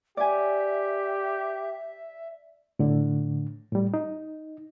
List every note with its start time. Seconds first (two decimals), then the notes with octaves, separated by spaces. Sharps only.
0.17 G4 D5 E5 G#5
2.79 A2 D3
3.72 A2 G3
3.94 D#4